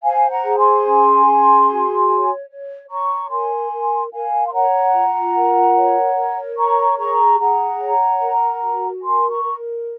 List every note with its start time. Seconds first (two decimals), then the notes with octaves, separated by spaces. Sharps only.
0.03 C5 F5 G#5
0.30 F#5 A#5
0.45 G#4
0.58 G#5 C6
0.86 C#4
1.26 G#4
1.68 F#4
2.08 C#5
2.49 C#5
2.89 C#5 A#5 C#6
3.30 A#4 G#5 C6
3.72 A#4
4.12 A#4 F5 G#5
4.47 C6
4.53 C#5 F#5 A#5
4.93 F4
5.36 A#4
5.76 C#5
6.16 A#4
6.57 C#5 A#5 C#6
6.99 G#4 A#5 C#6
7.39 G#4 F#5 A#5
7.80 C#5
8.21 A#4
8.62 F#4
9.02 A#4 G#5 C6
9.30 A#5 C#6
9.43 A#4